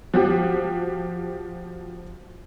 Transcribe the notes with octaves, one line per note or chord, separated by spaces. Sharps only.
F3 F#4 G4